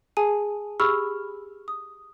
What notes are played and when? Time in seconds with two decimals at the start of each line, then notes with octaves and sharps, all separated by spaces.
0.17 G#4 G#5 A5 D#7
0.80 G4 G#4 B5 C#6 E6 F6
1.68 D#6